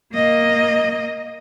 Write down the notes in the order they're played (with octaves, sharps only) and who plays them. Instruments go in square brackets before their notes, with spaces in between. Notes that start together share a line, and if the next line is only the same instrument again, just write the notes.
[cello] A#3 D#5